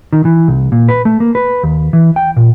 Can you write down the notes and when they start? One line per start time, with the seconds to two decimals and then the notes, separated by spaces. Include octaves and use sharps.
0.13 D#3
0.25 E3
0.48 C2
0.72 A#2
0.88 B4
1.05 A3
1.20 A#3
1.35 B4
1.63 D#2
1.93 E3
2.16 G5
2.37 A#2